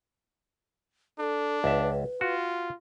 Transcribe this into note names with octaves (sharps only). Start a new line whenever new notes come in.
D4 A4
C#2 B4 E5
F4 F#4